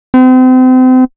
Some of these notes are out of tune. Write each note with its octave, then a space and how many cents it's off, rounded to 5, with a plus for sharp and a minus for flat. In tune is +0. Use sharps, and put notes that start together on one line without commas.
C4 -35